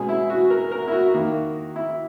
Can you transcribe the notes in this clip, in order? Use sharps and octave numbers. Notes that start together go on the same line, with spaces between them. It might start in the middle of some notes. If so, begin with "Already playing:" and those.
Already playing: B2 G#3 C#4 G#4
E4
F#4
A#4
A#4
E4
F#4
D#3 A#3 E4
E4